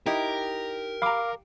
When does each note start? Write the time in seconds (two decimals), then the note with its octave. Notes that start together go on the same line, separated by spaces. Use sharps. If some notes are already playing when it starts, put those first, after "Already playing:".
0.06 D#4 E4 G4 A#4 D#5
1.02 F5 A#5 B5 D6